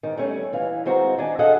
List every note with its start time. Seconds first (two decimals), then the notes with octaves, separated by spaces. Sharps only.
0.03 G#2 D#3
0.17 G3 A3 C#4
0.52 D#2 E3 F5
0.85 D#3 G#3 C4 F#4 C5 A#5
1.18 D#3 D4 G#5 A5
1.39 F#4 G#4 A4 D#5 F5 F#5